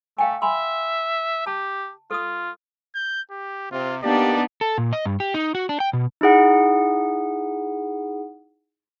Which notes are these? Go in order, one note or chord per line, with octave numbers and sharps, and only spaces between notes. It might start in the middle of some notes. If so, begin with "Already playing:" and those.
A3 F5 G5 G#5
E5 G#5 B5 C6
G4 A5
F4 A4 D#6
G6
G4
C3 F4
A#3 B3 D4 D#4 G4 D5
A4
A#2
D#5
G2
G4
D#4
F#4
D4
G5
B2
D#4 E4 G#4 F#5